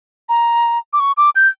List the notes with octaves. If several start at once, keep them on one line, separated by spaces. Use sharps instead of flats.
A#5
D6
C#6
D6
G6